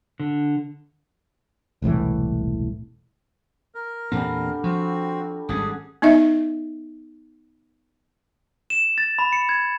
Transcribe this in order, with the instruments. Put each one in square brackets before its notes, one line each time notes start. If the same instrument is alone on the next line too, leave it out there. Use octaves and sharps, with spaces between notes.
[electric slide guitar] D3
[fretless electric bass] E1 C2 A2 E3
[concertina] A#4
[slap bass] E2 A#2 C4 [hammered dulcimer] D3 G3
[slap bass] F3 [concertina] C4 F#4
[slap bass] G#1 G3 C#4 [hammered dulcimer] D4 F#5 [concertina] G#4
[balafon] B3 D#4 D#5 E5
[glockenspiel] E7
A6
B5
C#7
G#6